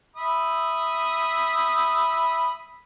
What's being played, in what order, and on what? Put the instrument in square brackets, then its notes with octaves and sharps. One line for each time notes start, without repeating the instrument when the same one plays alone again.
[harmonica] E5 B5 D#6